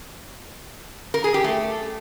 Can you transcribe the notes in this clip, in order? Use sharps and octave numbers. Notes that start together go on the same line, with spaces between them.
A#4
G#4
G4
A3